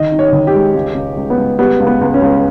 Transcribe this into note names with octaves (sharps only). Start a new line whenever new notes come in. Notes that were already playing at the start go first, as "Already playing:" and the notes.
Already playing: D#3 D#5
D#4
C#5
D#3
G4
G#3
C#2
C#2
C#2
B3
C#2
G3 B3
C#2
B3
C#2
C#4
C#2